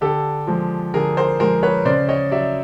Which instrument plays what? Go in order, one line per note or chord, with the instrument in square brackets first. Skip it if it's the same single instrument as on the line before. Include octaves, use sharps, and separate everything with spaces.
[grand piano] D3 G4 A4
F3 G#3
D3 G#4 A#4
A#4 C5
F3 G#3 A#4 C5
B4 C#5
C#3 C5 D5
C#5 D#5
F#3 D5 E5